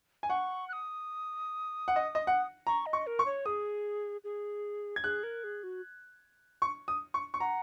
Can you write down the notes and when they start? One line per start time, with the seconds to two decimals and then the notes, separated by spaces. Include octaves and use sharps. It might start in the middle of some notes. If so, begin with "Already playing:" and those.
0.23 G#5
0.29 F#5 C#6
0.69 F#6
0.73 D#6
1.88 F#5
1.96 D#5
2.15 D#5
2.27 F#5
2.67 A#5 C#6
2.86 D#5
2.93 C#6
3.07 A#4
3.19 C#6
3.26 C#5
3.46 G#4 D#6
4.24 G#4
4.96 G#6
5.04 G#4 F#6
5.23 A#4
5.44 G#4
5.63 F#4
6.62 C#6
6.88 D#6
7.14 C#6
7.34 C#6
7.40 F#5 A#5